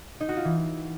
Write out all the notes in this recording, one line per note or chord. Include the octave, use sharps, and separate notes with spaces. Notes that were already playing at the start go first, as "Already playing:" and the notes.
D#4
F#4
F4
E3